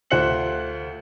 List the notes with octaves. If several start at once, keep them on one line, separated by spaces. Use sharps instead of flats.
D2 F4 C5 F#6 C#7 F#7